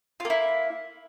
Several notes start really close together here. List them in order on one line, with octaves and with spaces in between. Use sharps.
F4 A#3 E4